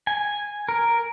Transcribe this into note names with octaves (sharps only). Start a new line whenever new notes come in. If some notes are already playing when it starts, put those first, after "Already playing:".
G#5
A#4